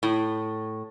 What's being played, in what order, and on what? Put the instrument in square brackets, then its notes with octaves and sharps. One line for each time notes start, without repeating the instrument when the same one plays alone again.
[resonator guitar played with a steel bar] A2